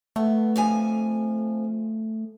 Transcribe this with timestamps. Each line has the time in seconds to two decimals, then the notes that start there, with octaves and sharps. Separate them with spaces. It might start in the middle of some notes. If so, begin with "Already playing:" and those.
0.16 A3 B3
0.56 F2 F3 G#5